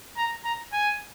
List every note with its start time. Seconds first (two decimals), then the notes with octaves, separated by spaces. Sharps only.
0.17 A#5
0.45 A#5
0.73 G#5